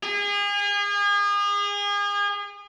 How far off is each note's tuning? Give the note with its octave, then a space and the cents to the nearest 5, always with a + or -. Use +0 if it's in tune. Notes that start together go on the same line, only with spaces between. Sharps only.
G#4 -35